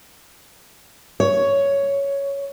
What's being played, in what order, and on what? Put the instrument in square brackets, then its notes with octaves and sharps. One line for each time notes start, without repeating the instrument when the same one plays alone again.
[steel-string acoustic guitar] C#5